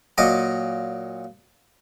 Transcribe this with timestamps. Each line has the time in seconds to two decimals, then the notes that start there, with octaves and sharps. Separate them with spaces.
0.18 A#2 F#3 D#5 D6